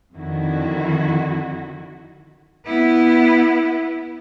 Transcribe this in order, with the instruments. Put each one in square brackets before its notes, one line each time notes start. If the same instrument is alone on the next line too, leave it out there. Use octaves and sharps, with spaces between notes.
[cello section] F2 D3 D#3 E4 F#4
[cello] B3 E4